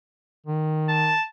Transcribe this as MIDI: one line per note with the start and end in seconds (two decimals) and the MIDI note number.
0.47 1.14 51
0.89 1.24 81